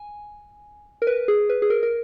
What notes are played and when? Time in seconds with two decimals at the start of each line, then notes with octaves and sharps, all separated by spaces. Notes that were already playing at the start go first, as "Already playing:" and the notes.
Already playing: G#5
1.02 A#4
1.07 B4
1.28 G#4
1.49 B4
1.62 G#4
1.70 A#4
1.83 A#4